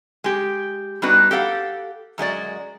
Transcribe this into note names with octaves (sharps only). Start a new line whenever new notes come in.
G#3 G4
G3 B3 D4 D#4 F#4 B4
G4 A4 F5 F#5
F#2 G#3 F#4 D5